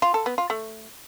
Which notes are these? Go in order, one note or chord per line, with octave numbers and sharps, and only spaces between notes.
F4
A4
B3
F4
A3